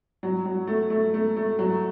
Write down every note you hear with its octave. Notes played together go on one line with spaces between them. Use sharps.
F#3
F#3
A3
A3
A3
A3
F#3